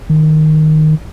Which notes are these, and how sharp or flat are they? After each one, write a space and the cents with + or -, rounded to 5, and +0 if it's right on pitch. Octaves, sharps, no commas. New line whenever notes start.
D#3 -5